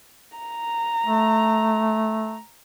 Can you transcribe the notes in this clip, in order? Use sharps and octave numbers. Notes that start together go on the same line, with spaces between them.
A#5
A3